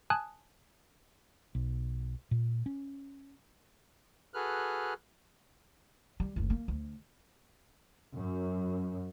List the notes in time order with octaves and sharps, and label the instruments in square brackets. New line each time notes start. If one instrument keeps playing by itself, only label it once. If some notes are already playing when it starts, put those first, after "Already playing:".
[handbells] G#5 A5 D#6 F#6 G#6
[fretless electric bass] B1
A#2
C#4
[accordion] F#4 G#4 A4 B4 F6 F#6
[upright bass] G3
F#1 D2
A#3
D2
[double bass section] F#2